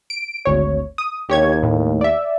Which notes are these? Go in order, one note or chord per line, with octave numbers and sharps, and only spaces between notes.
D7
G#1 D2 C#5
D#6
D#2 G4 C#5 G#6
A2
D5 E5